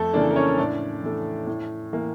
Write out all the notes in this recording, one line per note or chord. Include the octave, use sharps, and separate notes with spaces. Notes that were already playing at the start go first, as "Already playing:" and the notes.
Already playing: F2 A3 A4
C#3 E3 A#3 D4 D5
A#4
C#4 C#5
A2 D4 D5
E3 A3
A2
E3 A#3